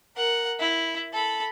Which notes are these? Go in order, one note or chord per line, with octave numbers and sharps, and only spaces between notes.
A#4 F#5
E4
A4 B5